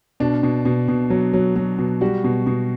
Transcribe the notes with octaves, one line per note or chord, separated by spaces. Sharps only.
B2 D4
B2
B2
B2
F#3
F#3
F#3
B2
G3 F#4
B2
B2